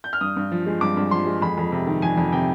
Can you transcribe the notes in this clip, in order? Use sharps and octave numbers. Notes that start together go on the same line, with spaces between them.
G6
F6
G2 D#6
G2
F3
G#3
G2 D6
G2
F3 C6
G#3
F2 B5
F2
C3
D#3
F2 G#5
F2
C3 G5